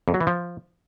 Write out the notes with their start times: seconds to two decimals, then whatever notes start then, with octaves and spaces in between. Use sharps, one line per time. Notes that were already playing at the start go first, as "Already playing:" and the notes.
0.08 F2
0.14 F#3
0.21 E3
0.27 F3